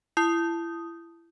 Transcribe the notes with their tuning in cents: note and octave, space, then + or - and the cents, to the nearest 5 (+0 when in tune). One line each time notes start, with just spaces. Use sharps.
E4 +30 D#6 +0